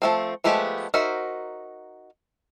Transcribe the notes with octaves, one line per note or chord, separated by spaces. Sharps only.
F3 A3 C4
F3 G#3 A3 B3 G4
D#4 F#4 A#4 C5 E5